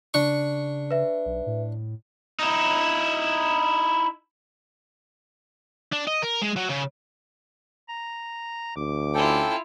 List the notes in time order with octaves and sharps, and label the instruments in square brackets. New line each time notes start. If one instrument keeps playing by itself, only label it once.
[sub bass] C#3 [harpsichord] D4 C#6
[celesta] B4 E5
[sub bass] B1
A2
[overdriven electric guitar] D#4 E4
[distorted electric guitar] D4
D#5
A#4
G#3
F#3
C#3
[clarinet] A#5
[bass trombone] D2 [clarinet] D6
[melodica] C#4 A4 G5 [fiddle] E4 F4